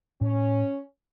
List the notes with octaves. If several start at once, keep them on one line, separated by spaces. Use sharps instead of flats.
A2 C#4